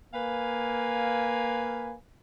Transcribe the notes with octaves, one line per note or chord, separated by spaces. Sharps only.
A#3 B4 F5 G#5